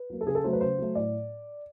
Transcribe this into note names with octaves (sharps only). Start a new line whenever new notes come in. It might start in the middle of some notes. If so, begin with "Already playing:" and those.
Already playing: B4
F#3 A#3
A4
C#3 G#4
A4
F#3 A3 C5
B4
C#3 C5
F#3 A3
A2 D5